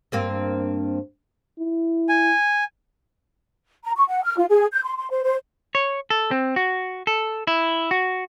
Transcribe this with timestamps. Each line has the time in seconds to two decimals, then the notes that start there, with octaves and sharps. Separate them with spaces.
0.12 G2 A#3 C4
1.59 E4
2.09 G#5
3.85 A#5
3.96 C#6
4.08 F#5
4.24 F6
4.37 F4
4.49 G#4
4.72 G6
4.84 C6
4.97 C6
5.10 C5
5.24 C5
5.75 C#5
6.10 A4
6.31 C4
6.56 F#4
7.07 A4
7.47 E4
7.91 F#4